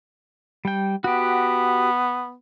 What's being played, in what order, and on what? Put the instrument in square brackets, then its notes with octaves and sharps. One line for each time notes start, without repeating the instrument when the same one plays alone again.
[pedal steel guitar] G3 G5
[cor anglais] B3 [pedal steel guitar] F#4 G4